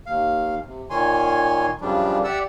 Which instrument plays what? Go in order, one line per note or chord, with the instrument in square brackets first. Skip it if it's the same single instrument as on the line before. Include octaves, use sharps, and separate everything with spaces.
[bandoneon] D#2 F5
C3
A#2 D#3 C#5 G#5 C6
F#2 C#3 F3 G3 D4
G4 D5 E5 F#5 E6